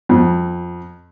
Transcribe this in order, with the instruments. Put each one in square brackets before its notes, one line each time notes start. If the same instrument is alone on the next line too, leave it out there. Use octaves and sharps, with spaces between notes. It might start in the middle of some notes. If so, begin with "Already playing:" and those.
[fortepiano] F2